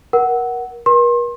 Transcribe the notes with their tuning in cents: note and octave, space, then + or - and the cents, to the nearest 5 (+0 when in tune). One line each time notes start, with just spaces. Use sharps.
A#4 +25 F#5 +10
A#4 +45 C6 +30